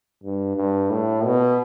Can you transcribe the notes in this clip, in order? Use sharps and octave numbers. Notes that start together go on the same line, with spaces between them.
G2
G2
A2
B2